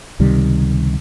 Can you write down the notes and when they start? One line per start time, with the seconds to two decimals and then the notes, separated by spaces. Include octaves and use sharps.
0.20 C#2 C3 D#3 G3